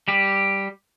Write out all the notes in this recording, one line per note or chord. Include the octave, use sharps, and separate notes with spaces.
G3 G4